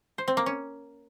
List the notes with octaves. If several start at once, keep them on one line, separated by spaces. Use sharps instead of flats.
C5
C4
A#3
C#4